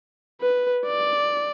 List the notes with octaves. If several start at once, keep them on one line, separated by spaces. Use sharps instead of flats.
B4
D5